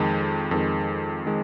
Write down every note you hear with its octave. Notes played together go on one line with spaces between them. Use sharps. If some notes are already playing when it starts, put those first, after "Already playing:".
Already playing: F2 D#3 G#3
F2 D#3 G#3
D#3 G#3